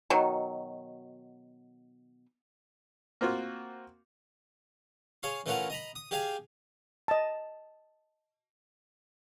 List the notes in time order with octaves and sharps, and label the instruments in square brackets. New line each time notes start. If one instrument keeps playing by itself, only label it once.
[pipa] B2 D#3 F#3
[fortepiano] A#3 C4 F4 F#4
[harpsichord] G#4 C#5 F5 C6
E3 A3 C#4 F4 A#4 F#5
D#5 A#5 B5
D#6
G4 G#4 D5 F5 G5 G#5
[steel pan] D#5 A5